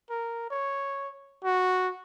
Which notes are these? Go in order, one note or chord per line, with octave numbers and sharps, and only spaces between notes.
A#4
C#5
F#4